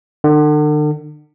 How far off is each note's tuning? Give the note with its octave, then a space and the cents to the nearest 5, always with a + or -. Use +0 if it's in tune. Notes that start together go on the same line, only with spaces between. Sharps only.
D3 +40